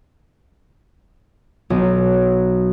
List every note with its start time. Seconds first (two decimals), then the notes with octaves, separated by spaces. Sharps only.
1.70 B1